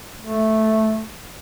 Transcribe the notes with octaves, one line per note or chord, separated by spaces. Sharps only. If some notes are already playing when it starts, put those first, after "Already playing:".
A3